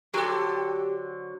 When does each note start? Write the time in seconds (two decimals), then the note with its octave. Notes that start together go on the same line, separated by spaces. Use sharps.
0.14 D3 F#3 G4 A4 C5